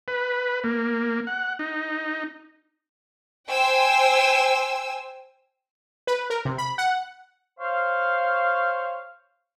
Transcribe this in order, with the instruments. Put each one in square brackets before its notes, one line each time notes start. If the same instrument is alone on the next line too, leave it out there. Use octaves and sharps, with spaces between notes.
[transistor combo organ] B4
A#3
F#5
D#4
[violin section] C5 G5 G#5 E6
[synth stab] B4
A#4
C3
B5
F#5
[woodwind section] C5 C#5 F5